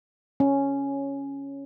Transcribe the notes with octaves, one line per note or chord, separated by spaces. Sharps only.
C#4